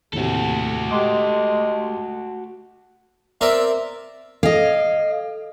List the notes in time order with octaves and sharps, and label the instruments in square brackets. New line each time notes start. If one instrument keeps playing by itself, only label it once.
[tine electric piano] D#2 A2 C3 [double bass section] A3 [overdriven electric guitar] F#4 A4
[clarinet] G#3 [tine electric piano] G4 C6 D6
[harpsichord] C4 A#4 D5 [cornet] E5
[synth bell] A4 [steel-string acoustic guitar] D#5 F5